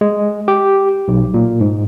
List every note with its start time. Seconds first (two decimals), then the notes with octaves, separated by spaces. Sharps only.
0.01 G#3
0.48 G4
1.08 B1
1.34 A#2
1.61 G#2